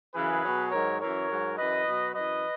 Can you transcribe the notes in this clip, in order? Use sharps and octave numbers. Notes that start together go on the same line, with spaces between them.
F#2 C#3 E3 G#4 B4
B2 F#3
G#2 D#3 F#3 A#4 C#5
F#2 E3 A#4 C#5
G#2 F#3
F#2 E3 B4 D#5
B2 F#3
F#2 E3 B4 D#5